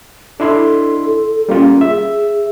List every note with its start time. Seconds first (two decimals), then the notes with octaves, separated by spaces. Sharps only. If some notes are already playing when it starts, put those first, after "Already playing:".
0.40 D4 E4 A4 C6
1.49 G3 A#3 C#4 F4
1.81 G#4 E5